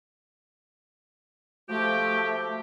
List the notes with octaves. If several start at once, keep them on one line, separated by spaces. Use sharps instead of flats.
F3 A3 F#4 G4